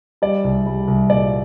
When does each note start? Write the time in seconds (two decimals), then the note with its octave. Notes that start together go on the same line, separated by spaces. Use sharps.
0.22 G3 D5
0.44 C2
0.66 G3
0.88 C2
1.10 A#2 D5